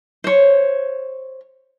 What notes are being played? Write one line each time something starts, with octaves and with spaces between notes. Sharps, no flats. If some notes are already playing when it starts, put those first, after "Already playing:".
C5 C#5